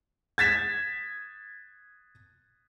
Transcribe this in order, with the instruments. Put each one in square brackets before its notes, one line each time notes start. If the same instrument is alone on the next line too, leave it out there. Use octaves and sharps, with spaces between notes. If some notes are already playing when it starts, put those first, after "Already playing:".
[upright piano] G#6 A6 B6 E7